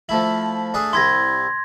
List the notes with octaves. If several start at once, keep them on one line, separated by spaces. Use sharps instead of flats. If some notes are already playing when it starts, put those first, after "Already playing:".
F3 A3 E4 F#7
A3 D4 G#4
C2 E4 C6 G#6 A#6